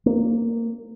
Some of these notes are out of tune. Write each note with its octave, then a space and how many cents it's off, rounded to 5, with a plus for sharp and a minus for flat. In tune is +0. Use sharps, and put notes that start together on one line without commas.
A#3 -15